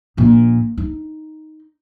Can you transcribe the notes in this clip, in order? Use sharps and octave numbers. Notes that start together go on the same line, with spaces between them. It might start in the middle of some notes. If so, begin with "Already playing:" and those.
A#1 A#2
D#4